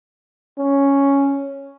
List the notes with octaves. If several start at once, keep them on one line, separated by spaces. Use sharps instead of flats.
C#4